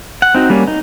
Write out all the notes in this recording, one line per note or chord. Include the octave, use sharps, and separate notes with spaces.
F#5
C4 D#4 F#4
G3 A#3 C#4
D#4